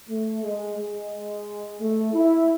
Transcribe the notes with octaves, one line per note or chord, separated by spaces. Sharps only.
A3
G#3
G#3
A3
E4